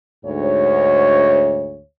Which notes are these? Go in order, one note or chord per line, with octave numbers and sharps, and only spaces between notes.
D2 G#2 C#5